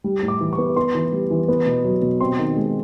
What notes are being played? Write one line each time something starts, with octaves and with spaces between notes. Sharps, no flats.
G3
A2
D6
E3
C#6
B3
B3 C6
E3
G3
E3
B3
B2
F#3
B2
C4 C6
D#3
G#3